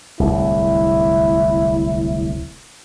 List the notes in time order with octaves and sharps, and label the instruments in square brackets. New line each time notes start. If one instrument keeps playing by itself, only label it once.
[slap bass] D1 C2 [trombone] E4